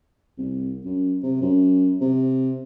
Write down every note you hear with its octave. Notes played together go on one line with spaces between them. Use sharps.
C2
F#2
C3
F#2
C3